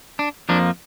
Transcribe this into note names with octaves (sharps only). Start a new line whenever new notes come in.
D4
F2 F3 A#3 D4